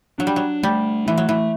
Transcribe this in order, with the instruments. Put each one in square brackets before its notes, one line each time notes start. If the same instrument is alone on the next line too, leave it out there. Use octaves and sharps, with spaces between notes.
[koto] F#3 [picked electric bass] D4
[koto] G3
F#3
[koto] G3 [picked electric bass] A3
[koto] E3 [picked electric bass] A3
[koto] F#3
E3